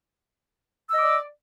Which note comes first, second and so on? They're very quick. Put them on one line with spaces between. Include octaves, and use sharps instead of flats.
E6 D#5 D6 D5